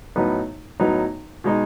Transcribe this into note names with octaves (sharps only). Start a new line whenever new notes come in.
A2 F#3 B3 D#4
A2 F#3 B3 D#4
B2 G#3 D#4